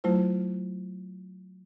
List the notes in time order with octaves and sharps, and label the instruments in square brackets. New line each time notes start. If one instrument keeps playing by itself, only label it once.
[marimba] F#3 A3 E4 F4 C5